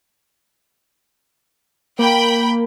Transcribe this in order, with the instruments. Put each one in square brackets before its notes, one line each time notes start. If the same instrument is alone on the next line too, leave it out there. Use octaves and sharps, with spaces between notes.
[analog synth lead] A#3 [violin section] G5 B5